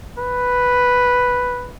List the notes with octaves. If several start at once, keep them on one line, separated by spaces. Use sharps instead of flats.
B4